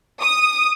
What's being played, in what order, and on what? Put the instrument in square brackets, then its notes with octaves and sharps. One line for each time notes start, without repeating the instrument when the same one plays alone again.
[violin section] D#6